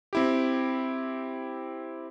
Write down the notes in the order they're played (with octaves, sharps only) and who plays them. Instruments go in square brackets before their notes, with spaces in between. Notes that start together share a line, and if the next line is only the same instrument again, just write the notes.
[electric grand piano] C4 E4 G4